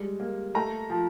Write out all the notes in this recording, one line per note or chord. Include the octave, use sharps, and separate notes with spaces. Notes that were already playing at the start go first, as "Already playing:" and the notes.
Already playing: G3 G#3
A#3
A3 A#5
F3